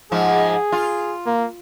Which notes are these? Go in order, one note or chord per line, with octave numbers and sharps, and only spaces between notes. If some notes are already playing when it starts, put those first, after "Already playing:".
G#2 F3 G#4
F4
A#3